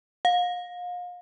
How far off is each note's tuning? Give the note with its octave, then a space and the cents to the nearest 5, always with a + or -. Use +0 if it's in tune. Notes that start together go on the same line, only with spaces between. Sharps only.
F5 +35